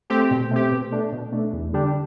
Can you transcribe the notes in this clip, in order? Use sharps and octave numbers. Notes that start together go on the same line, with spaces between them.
A3 C4 G4
B2
A3 C4 G4
B2
A3 D4
B2
A3 D4
E2
D3 G3 D4 G4